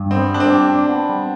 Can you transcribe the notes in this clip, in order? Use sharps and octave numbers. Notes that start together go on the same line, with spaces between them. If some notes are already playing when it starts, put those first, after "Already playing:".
Already playing: G2
B3 C4
G3 D4
C4
G4
D4
B3
G3